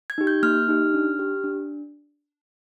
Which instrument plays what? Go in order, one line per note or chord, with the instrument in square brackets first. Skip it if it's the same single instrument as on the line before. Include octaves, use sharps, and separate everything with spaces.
[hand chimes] G#6
D#4 G4
G6
A#3 F6
D#4 G4
D4
G4
D4